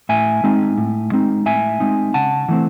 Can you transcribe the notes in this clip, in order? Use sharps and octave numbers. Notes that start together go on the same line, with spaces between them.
A2 E5 G#5
G#3 C4 D#4
A2
G#3 C4 D#4
A2 E5 G#5
G#3 C4 D#4
C#3 F#5 A5
E3 A3 C4